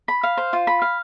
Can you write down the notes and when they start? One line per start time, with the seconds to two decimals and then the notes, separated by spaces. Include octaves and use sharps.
0.08 B5
0.23 F5
0.37 C5
0.53 F4
0.67 B5
0.82 F5